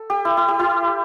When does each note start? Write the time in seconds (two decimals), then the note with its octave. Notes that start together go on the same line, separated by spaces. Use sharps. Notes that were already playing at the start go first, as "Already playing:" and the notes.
Already playing: A4
0.10 G4
0.25 E4
0.37 E4
0.48 G4
0.59 E4